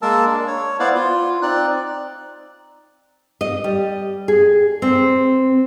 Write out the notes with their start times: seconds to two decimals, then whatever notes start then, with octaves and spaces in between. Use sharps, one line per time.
0.02 G#3 A#3 A#4 A5 E6
0.26 D4
0.47 C#5
0.80 B3 E4 C5 D5 F5 F#5
0.94 F4
1.42 C4 D#4 D5 F#6
3.41 D#5
3.64 G3
4.28 G#4
4.82 C4